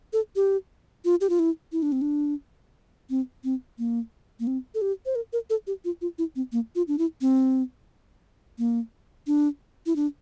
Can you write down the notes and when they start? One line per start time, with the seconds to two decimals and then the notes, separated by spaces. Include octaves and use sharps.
0.13 A4
0.36 G4
1.05 F4
1.21 G4
1.30 F4
1.39 E4
1.72 E4
1.82 D4
1.92 C4
2.02 D4
3.10 C4
3.44 C4
3.79 A#3
4.40 A#3
4.47 C4
4.75 A4
4.82 G4
5.06 C5
5.15 A#4
5.33 A#4
5.50 A4
5.67 G4
5.85 F4
6.01 F4
6.18 E4
6.36 C4
6.52 A#3
6.75 F4
6.88 D4
6.98 E4
7.21 C4
8.58 A#3
9.27 D4
9.86 E4
9.96 D4